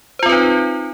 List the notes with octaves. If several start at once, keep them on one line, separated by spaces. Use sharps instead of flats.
C4 D#4 F4 B4 C5